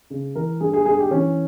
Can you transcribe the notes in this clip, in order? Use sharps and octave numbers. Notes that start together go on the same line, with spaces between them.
C#3
E3 A#4
G2 G#4
G#4
G2 G#4
G4
E3 C#4